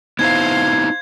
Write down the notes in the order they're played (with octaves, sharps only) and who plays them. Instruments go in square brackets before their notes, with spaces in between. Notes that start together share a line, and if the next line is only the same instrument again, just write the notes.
[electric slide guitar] B3 D#4 E4 [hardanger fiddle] C5 F5 [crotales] G#6